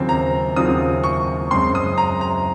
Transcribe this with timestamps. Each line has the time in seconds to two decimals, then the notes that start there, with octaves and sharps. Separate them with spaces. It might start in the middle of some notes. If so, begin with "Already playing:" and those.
Already playing: D#2 C#3 F#3 C4 F4
0.09 A#5
0.56 D#2 C#3 F#3 C4 F4 D#6
1.04 C#6
1.51 F#2 C#3 G#3 C4 C6
1.75 D#6
1.98 A#5
2.21 A#5